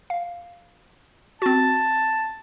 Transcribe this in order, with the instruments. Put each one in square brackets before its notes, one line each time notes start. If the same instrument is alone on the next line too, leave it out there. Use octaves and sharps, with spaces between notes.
[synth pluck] F5
[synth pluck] C4 F#4 [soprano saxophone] A5